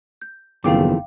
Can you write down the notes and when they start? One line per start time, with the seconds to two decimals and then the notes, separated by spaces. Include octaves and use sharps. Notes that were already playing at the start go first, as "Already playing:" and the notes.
0.21 G6
0.64 F#1 E2 D#3 F3 A3 F5 G5 D6